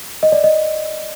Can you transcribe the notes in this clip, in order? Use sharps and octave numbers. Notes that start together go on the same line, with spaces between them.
D#5
D5
D#5